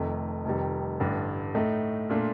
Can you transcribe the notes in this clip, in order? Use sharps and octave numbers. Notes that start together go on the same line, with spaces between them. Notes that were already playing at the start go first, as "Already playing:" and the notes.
Already playing: F1 F2 D#3 A3
F1 F2 D#3 G3
A1 G2 D3 G3 D4
A2 A3 D#4
A#2 A3 D4 F4